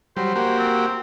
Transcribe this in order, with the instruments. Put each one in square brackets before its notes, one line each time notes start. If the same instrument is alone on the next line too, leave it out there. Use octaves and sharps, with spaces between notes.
[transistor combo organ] F#3 G3 [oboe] C5
[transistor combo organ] A#3 F#4 G4
[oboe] C4